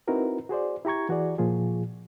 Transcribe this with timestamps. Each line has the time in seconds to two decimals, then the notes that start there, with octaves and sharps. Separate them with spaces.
0.08 C4 D#4 E4 F#4 A#4 B4
0.49 F#4 G#4 C5 D5
0.85 E4 G4 A#5 C#6 G#6
1.09 E3 F#4 G#4 D5
1.38 A#2 F3 F4 G#4